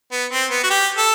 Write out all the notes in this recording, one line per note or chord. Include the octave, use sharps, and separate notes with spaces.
B3
C4
B3
F#4
G4
A4